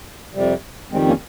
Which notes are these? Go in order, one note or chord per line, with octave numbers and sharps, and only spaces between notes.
F2 C3 G3
F2 D#3 G3 G#3 C4
A#3 C#4